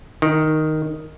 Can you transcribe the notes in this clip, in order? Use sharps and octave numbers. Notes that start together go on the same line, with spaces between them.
D#3